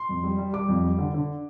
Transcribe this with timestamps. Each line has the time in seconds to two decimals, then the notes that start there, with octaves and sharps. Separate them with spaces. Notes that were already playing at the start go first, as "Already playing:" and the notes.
Already playing: C6
0.09 F2
0.24 G3
0.39 G3
0.53 G3 D6
0.68 F2
0.83 G3
0.98 D3
1.14 D3